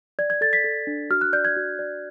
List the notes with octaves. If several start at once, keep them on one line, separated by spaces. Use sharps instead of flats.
D5 G#6
G#6
A4 A6
B6
A4
D4
F#4 F6
F#6
D5 G6
G#6
F#4
D5